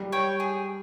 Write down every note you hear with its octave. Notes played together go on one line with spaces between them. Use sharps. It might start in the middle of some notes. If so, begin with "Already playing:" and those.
Already playing: G3
C#5 G5
G#4